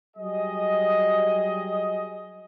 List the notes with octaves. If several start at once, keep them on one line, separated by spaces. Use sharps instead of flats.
F#3 G3 G#4 D#5